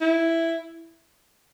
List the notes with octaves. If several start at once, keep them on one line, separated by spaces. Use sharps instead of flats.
E4